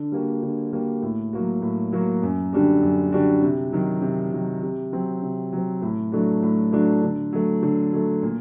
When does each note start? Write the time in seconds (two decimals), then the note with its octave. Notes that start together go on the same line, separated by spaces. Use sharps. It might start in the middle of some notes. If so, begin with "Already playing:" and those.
Already playing: D3
0.12 G3 A#3 F#4
0.42 D3
0.73 G3 A#3 F#4
1.02 A2
1.33 F#3 A#3 F#4
1.62 A2
1.92 F#3 A#3 F#4
2.23 F#2
2.53 D3 G3 D4 F#4
2.82 F#2
3.12 D3 G3 D4 F#4
3.42 C3
3.72 D#3 F#3
4.02 C3
4.32 D#3 F#3
4.63 C3
4.92 F#3 C4
5.22 C3
5.52 F#3 C4
5.82 A2
6.12 F#3 A3 D4 F#4
6.43 A2
6.72 F#3 A3 D4 F#4
7.02 D3
7.32 F#3 A3
7.63 D3
7.93 F#3 A3
8.23 A#2